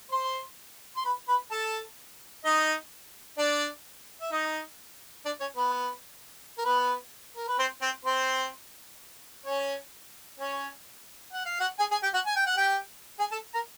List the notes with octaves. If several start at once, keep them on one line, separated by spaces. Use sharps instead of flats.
C5 C6
C6
B4 B5
B4 B5
A4 A5
D#4 D#5
D4 D5
E5
D#4 D#5
D4 D5
C#4 C#5
B3 B4
A#4
B3 B4
A#4
B4
C4 C5
C4 C5
C4 C5
C#4 C#5
C#4 C#5
F#5
F5
F#4 F#5
G#4 G#5
G#4 G#5
G4 G5
F#4 F#5
G#5
G5
F#5
G4 G5
G#4 G#5
A4 A5
A#4 A#5